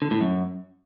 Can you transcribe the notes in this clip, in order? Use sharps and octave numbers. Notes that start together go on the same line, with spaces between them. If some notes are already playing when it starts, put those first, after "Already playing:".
D3
A2
F#2